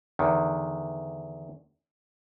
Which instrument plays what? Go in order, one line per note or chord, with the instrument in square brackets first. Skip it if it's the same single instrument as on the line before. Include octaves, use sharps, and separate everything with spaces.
[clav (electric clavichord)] E2 D3 D#3